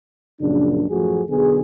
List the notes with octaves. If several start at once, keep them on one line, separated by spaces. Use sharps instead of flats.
A#1 F#2 C#3 D4
A1 F#2 F3 A3 F#4 G#4
B1 D3 B3 G#4